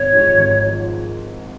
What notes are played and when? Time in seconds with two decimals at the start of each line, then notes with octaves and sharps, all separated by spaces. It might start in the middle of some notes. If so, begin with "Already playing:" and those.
Already playing: G#1 C#5
0.12 G#2 F3
0.37 G#1
0.66 F3